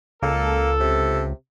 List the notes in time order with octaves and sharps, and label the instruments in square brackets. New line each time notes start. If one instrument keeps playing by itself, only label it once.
[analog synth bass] C#2 [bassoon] A#3 [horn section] A4
[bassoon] C3